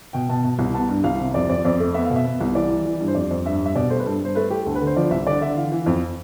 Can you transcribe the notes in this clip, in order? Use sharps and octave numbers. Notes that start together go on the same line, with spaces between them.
B2 G5
B2 A5
B2
C2
B3 A5
G2
C2 F5
C3
F2 D5
F2 D5
F2 D5
A3
B3 E5
F5
B2
E5
B3
C2
E3 D5
E3
E3
G2
C5
F2 D5
F2
G2 E5
G2 E5
B2 D5
A3 C5
B4
G2 A4
G2 C5
A3 B4
A3 G4
D2 A4
B4
D3
C5
F3 D5
C2 E5
D3 D5
D3 E5
E3 F5
E3
F2